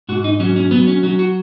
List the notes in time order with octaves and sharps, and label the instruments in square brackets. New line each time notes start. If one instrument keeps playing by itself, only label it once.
[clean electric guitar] G#2 F#4
D#4
F#3 C#4
C#4
F#3 B3
C#4
F#3 C#4
F#4